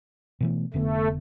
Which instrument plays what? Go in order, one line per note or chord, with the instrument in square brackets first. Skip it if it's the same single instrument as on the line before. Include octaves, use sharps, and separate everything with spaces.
[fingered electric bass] B2 E3 A3
[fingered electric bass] F1 D3 B3 [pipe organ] A3